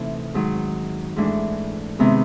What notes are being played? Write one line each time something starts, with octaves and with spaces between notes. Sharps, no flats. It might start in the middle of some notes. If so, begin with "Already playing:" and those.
Already playing: C3 E3 A3 D#4
G#2 D#3 F#3
G#2 E3 A3 D4
C3 D#3 G#3 B3